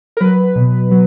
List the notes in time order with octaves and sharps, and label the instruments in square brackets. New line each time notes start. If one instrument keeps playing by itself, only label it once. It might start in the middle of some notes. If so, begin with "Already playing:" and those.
[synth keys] A#4
F#3 B4
B2
F#3